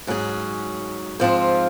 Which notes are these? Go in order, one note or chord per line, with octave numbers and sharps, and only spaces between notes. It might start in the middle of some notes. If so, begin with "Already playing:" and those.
G#2 F#3 C#4 G#4
G#2 F3 C4 F4